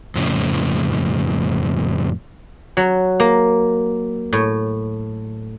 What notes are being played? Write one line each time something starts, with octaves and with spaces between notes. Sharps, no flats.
F2 A2 C#3
F#3
A#3
A2